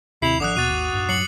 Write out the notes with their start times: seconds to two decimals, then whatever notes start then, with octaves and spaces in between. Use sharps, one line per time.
0.22 D#2 C3 C4 E4 C7 F7
0.40 G#1 D3 F3 D4 D6 D#6 F#6
0.57 D#2 B2 F#4 A6 D#7
0.70 G#1
0.93 F#2 A2
1.09 F#3 C7 C#7 F#7